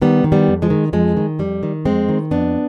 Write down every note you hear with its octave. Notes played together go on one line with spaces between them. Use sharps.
D#3 G3 B3
D#3
G3 B3
F2
F3 G#3
D#3
F2 F3 G#3
D#3
F2 G3
D#3
F2 G#3 C4
D#3
F2 B3 D4